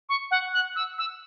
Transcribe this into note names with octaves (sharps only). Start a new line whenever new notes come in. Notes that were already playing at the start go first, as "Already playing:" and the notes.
C#6
F#5
F#6
E6
E6